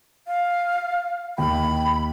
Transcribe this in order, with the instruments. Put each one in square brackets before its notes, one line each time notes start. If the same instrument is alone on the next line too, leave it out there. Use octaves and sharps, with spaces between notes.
[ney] F5
[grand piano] D#2 G5 [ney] B5